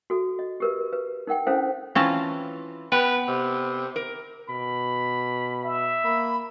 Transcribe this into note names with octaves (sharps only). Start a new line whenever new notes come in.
F#4 A4
D#5
G4 A#4 B4
B4
D#4 A#4 F#5 G5
C#4 D4 E4 A4 C5 F5
E3 C4 C#4 F4 A5
B3 B4 G5
C3
A#4
B2 B5
E5
A#3 B5